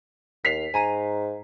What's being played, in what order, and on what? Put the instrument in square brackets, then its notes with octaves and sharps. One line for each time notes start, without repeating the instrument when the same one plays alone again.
[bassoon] D#2 [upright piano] B6 C7 F7
[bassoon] G#2 [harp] G#5 A#5 D#7